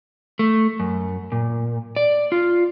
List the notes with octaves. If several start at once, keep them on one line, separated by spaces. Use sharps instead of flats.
A3
F#2
A#2
D5
F4